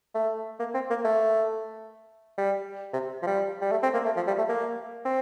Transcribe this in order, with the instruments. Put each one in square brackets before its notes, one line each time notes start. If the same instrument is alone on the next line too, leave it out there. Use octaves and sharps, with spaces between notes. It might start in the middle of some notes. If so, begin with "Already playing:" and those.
[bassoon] A3
A#3
C4
A#3
A3
G3
C3
F3
G3
G3
A3
C4
A#3
A3
F3
G3
A3
A#3
C4